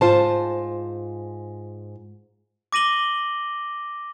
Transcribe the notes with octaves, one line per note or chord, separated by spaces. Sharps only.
G#2 F4 C5 A5
D6 A#6 D#7 F#7 G7